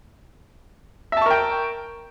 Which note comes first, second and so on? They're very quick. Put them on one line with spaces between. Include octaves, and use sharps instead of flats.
E5 A5 C#6 A#4 G5